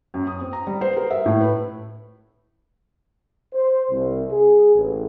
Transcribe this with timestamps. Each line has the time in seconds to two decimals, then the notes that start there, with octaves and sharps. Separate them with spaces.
0.14 F#2
0.27 D#6
0.41 C4
0.53 A#5
0.67 G3
0.81 C5
0.97 A#4
1.11 E5
1.26 A2
1.40 B4
3.53 C5
3.91 C2
4.29 G#4
4.73 A1